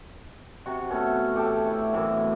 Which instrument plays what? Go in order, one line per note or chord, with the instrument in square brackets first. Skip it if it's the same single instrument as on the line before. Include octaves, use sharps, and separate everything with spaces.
[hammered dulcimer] C3 F#4 C#6
A3 B3 C#4
A2 A3 G4 A5
E4
F#2 A2 E3 C4